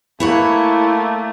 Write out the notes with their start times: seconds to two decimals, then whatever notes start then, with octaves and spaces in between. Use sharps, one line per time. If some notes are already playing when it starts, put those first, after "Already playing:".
0.20 A3 A#3 E4 C#5 F#5